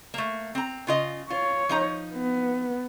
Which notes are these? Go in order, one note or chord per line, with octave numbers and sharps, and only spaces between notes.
A3 A#3
C4 A#5
C#3 F4 D#5
F4 C#5
F3 D#4 A#5
B3